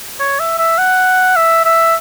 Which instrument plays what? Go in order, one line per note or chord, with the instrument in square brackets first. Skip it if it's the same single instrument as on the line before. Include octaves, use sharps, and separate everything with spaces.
[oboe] C#5
E5
E5
F#5
E5
E5